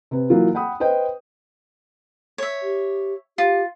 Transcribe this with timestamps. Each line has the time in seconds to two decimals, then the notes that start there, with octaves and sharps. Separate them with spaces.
0.11 C3 B4
0.30 E3 F#3 A#3 F4
0.55 F#5 G5 B5 D#6
0.80 B4 C5 D#5 G5
2.38 C#5 E5
2.63 G4
3.38 F4 G4